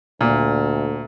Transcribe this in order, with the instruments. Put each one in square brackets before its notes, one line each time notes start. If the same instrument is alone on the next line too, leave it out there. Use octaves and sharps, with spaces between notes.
[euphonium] D2 [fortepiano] A#2